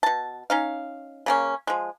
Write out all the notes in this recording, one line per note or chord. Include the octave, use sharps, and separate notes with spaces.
B2 A5
C#4 D#4 F5
C#3 A#3 C#4
F3 G#3